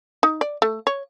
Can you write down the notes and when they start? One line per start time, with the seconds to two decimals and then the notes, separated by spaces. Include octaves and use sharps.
0.23 D#4
0.41 D5
0.62 A3
0.87 C#5